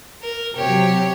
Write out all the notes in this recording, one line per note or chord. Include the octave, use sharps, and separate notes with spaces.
A#4
C3 F#3 G4 C#5